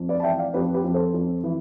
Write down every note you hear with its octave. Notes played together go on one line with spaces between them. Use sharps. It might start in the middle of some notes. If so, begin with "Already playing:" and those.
Already playing: F2
B4 D5
A5
E3 E5 G5
D5 F5
F2 G4 B4
G4 B4
F2
A4 C5
F2
E3